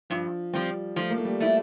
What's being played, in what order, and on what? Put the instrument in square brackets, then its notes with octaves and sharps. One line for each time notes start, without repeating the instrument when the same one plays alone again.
[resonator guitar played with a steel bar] G2 [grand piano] F3
[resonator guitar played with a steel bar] F3 C4 [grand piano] G3
[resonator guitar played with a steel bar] F3 [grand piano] A3
[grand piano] A#3
A3
G3
[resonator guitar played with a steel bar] A3 E4